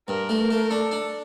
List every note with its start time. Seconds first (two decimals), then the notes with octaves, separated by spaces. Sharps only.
0.08 G2 A#4
0.29 A3
0.40 A#4
0.51 A3
0.70 D4 A4
0.91 D4